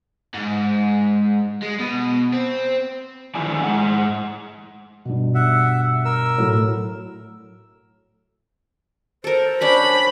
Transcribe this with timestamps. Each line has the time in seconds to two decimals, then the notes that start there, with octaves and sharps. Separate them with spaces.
0.34 G#2
1.63 G#3
1.80 B2
2.33 C4
3.35 D3 D#3 F3 E4 D5 G#5
3.64 G#2 G#3 F#5
5.05 G2 B2
5.35 E5 F#5
6.05 A#4 E6
6.38 A2 F#3 A3
9.24 A4 A#4 C5
9.61 C#4 D4 A#4 B5